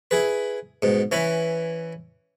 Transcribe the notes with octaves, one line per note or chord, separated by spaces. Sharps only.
E4 G#4 B4
G#2 B2
E3 C#4 E4 B4